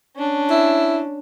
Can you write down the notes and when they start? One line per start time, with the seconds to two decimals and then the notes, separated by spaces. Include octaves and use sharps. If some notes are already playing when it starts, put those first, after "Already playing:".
0.16 C#4 D4
0.50 E4